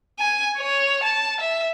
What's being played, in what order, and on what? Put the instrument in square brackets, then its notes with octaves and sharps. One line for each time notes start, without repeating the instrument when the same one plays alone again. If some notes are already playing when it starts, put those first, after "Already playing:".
[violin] G#5
C#5
A5
E5